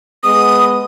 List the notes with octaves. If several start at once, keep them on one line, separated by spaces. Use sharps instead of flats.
G#3 B3 D#6